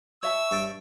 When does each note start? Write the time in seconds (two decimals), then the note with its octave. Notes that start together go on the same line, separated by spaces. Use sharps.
0.23 C#5 E5 A5 C#6 E6
0.51 G2 A4 G5